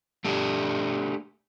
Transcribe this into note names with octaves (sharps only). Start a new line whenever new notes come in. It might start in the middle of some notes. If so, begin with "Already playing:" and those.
A3 D4 G4